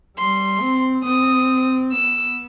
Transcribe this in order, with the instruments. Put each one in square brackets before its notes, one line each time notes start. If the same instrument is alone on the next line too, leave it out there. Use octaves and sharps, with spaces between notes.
[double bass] G3 [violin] C6
[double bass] C4
[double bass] C4 [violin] D#6
[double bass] B3 [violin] E6